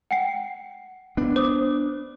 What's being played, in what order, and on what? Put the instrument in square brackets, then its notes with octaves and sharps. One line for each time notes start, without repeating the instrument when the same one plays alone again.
[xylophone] F#5 G5 C7
[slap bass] B3 D4
[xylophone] C5 D6 D#6